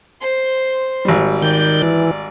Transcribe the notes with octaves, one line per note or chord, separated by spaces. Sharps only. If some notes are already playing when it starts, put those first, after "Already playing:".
C5 C6
G#1 G3
D#3 D5 G6
E3